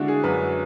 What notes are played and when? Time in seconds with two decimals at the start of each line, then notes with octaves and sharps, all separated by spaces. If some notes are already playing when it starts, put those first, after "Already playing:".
Already playing: D3 G#3 D4 E4 F#4
0.08 G#4
0.24 F#2 B4